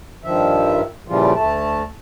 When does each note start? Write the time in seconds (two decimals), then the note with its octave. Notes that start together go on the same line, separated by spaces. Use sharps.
0.24 G2 D#3 F3 E5
1.08 A#2 C#3 E3 F3 G3 F4
1.35 D2 A3 A5